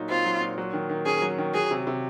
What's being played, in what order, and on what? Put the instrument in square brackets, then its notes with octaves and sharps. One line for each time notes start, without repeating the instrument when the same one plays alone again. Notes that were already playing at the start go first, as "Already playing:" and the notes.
Already playing: [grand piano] A#2 F#3 D#4
[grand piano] C4 [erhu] F4
[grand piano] F#3
A#2
F#3
D#3
D#3
[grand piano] C#4 [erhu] G#4
[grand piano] F#3
D#3
[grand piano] F#3 [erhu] G#4
[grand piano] C3
C3